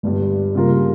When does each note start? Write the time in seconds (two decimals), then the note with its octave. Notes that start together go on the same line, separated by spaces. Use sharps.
0.03 G1 G2 G3
0.55 C#3 G3 A#3 F4 A#4